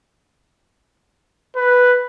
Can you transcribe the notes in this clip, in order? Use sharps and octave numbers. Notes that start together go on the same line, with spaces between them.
B4